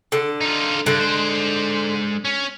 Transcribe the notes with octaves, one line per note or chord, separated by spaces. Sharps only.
D3
D#4 F4
G2 D3
G#3 C5
C#4